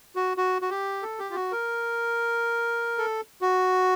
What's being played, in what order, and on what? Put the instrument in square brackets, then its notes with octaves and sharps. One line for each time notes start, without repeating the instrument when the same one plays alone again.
[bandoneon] F#4
F#4
F#4
G4
A4
G4
F4
F#4
A#4
A4
F#4